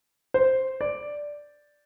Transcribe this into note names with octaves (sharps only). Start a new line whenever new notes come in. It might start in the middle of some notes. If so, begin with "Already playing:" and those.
C5
D5